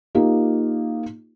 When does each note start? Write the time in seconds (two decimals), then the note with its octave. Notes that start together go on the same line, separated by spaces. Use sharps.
0.15 A#3 D#4 F4 G4